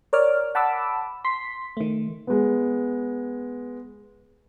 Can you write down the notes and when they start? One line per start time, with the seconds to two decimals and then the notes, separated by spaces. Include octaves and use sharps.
0.13 A#4 C#5 D5 D6 F6
0.55 F#5 A5 B5 D6 E6
1.25 C6 B6
1.77 D#3 A3
2.27 G#3 B3